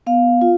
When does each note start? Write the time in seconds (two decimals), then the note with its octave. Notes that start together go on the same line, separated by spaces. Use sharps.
0.07 B3 F5
0.41 F4